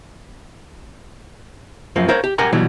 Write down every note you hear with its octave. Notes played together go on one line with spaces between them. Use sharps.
F#2 F3 A#3
A#4 C5 C#5 F5
G4
G4 A#4 F#5 G#5 A#5
B2 E3 F#3 G3